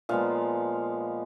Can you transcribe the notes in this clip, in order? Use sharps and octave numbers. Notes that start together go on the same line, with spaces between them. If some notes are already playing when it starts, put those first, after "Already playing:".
A#2 F3 G#3 B3 F5